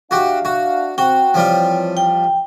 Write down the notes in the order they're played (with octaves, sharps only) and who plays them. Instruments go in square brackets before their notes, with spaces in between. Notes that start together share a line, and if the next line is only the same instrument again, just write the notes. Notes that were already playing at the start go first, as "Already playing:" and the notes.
[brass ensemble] D4 E5 F5 [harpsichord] F#4 G4
[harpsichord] F#4
[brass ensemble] C4 [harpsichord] F#4 [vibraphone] G5
[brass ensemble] E3 C4 C#5 [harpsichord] F3 G3 F4
[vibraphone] G5